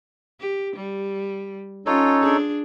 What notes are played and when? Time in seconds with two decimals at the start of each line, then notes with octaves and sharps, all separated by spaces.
0.40 G4
0.76 G3
1.86 C#4 D#4 F4 A4 C#5
2.22 D4 G#4